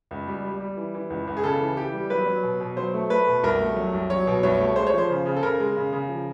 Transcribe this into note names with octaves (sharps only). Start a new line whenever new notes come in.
C#2
G3
G3
G3
E3
E3
C#2
C#2
G#4
C#3 A4
E3
E3 G4
G3
F#3 B4
F#3
B2
B2
F#3 C5
A3
A3 B4
B2
C2 A#4
A3
F#3
C2
F#3 C#5
B2
C2 C#5
A3
G#3 C5
C#5
F3 C5
C#3
C#3
A4
C#3 A#4
G#3
C#3
C#3
F3